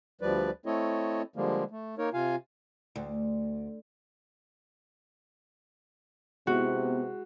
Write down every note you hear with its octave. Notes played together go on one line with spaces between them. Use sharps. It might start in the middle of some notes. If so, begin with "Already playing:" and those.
D2 F3 G3 B4 D5
A3 C4 E4 A4 C#5 D#5
D3 F3 G3 G#3 A#3
A3
A#3 D#4 A#4 C#5
C3 F4 F5 G#5
D2
C3 G#3 B3 E4 F#4